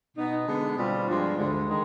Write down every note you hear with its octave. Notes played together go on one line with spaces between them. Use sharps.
B2 B3 D#4
D3 G#3 B3
B2 G3 C4 F4
G2 F3 G#3 D4
D2 D3 G#3
D#3 G#3